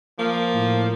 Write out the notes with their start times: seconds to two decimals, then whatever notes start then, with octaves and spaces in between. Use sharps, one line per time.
0.19 F3 A#3
0.54 A2